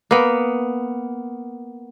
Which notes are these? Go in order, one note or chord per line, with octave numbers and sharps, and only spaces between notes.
A#3 B3